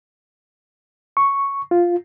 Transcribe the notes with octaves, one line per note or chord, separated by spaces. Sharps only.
C#6
F4